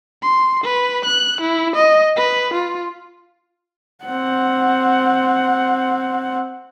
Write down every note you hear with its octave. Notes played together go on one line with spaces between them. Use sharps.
C6
B4
F#6
E4
D#5
B4
F4
C4 F#5